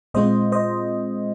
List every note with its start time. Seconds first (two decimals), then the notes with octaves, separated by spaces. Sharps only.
0.14 A#2 G#3 C4 F4 C5 D#5
0.52 C5 D#5